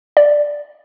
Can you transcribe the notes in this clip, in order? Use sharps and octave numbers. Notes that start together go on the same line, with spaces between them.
D5